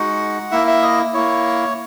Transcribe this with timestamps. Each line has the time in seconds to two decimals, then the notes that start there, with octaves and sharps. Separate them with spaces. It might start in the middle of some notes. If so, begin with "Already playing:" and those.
Already playing: G#3 D#4 F#4 F#5
0.51 A#3 E4 E5
0.67 E5
0.82 D#5
1.14 A#3 E4 C#5